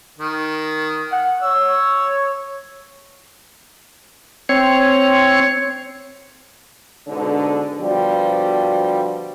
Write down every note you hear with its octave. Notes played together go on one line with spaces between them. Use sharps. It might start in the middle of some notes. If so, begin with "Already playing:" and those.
D#3
F#5
C#5 E6
C4 C#5
G#2 B2 D3
B2 D3 F3 G3 F#4